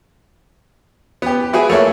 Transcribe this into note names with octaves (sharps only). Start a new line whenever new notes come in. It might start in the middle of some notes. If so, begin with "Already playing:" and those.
B3 G4
E4 F#4 G#4 B4
A3 A#3 C#5 E5